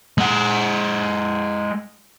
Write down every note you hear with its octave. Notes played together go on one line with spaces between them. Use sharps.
G#3 F#5